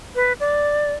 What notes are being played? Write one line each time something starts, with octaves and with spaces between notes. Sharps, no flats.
B4
D5